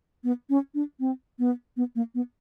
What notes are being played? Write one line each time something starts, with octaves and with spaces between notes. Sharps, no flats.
B3
C#4
D4
C4
B3
B3
A#3
B3